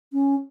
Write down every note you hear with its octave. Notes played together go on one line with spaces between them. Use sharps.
C#4